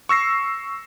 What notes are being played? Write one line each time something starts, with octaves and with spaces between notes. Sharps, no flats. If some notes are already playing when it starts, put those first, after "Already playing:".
C#6 E6 A#6 C7